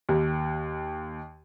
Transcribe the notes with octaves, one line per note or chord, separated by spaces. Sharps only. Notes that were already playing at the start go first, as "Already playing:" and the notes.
D#2